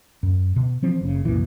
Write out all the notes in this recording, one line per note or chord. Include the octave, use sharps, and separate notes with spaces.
F#2
B2
E3 F3 C4
F#1 C#3
C2 F#2 A#2 E3